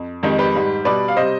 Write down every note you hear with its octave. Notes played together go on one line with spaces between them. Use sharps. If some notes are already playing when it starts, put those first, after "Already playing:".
Already playing: F2
F2 D#3 G#3 D#4 G4
G4 B4
G#2 G3
B2 G3 B4 D5
F5
C3 G3 C5 D#5